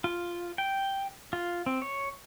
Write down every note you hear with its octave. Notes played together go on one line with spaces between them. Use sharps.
F4
G5
F4
C4
C#5